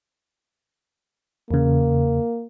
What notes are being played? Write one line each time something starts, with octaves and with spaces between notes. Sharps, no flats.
E2 C#3 A#3